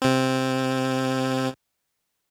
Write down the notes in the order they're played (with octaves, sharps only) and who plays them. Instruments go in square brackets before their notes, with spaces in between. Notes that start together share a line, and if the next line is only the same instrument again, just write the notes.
[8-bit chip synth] C3 C4